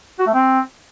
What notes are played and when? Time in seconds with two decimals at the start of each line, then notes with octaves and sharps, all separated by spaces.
0.19 F#4
0.26 A3
0.34 C4